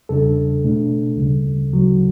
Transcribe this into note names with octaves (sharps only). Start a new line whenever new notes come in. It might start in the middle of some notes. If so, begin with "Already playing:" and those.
E2 C#3 G3 D4 A4
B2 A3 D4
D2 C#3 G3
D2 C#3 F#3